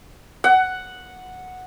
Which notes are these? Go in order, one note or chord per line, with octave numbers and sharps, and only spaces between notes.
F#5